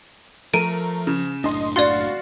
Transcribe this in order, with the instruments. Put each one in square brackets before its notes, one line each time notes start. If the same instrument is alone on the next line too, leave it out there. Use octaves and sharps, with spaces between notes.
[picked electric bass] F3 [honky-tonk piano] A3 A#4 [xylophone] D7 D#7
[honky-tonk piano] C#3
[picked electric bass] F#1 A2 D4 [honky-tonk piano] D#5 C6
[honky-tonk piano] F#4 F5 A6 [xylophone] D5 C6